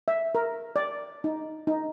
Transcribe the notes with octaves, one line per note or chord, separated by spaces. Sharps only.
E5
A#4
D5
D#4
D#4